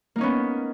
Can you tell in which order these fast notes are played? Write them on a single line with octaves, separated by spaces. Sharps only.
A#3 D#4 C#4 B3